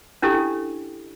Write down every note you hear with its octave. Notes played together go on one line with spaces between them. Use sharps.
C#4 D4 E4 G4 A4